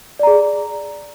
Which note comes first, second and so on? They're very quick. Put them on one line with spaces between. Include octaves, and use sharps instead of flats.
D5 A#5 G#4